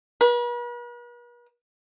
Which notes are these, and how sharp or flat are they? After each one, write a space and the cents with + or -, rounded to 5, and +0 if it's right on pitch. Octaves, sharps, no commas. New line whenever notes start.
B4 -45